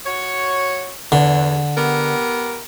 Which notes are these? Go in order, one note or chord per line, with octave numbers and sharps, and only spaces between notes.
F#4 C#5
E2 D3
B3 G4 A#4